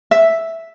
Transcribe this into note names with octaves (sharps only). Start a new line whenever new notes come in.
E5